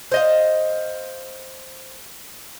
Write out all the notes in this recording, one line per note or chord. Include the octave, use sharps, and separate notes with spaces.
C5 D#5 F5